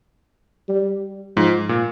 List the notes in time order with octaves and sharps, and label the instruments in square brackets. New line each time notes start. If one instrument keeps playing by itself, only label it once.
[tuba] G3
[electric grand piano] G#2 [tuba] F3
[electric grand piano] A#2